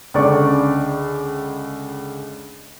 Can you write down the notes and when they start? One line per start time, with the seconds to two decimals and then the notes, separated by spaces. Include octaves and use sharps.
0.14 C#2 D3 D5 C#6 D6